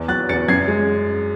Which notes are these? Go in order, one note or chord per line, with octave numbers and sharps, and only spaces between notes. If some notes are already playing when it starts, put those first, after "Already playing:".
Already playing: E2
F#3 F#6 A6
E2 A6 C#7
F#2 G#6 C7
G#3